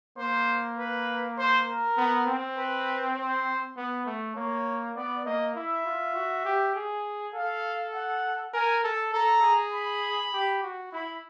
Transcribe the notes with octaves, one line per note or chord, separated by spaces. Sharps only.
A#3 C5
B4
C5
A#4
B3
C4
B4
C5
B3
A3
A#3 C#5
B3 D5
A#3 D#5
E4 E5
F4
F#4
G4
G#4
A4 F5
F#5
A#4 G#5
A4 A5
A4 A#5
G#4
B5
G4
F#4
E4 B5